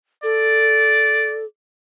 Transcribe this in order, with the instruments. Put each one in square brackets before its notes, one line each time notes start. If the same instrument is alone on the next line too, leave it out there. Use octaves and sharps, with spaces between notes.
[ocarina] A4 [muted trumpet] D5